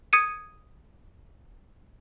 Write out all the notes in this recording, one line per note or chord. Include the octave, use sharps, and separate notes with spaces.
D#6 G#6 C#7 D#7